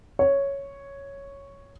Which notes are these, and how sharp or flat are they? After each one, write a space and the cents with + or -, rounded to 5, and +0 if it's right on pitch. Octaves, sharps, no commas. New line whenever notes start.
C#5 +0